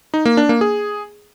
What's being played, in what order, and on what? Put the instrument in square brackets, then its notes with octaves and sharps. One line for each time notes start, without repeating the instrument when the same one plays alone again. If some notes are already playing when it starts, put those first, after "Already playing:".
[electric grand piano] D#4
A#3
D4
A#3
G#4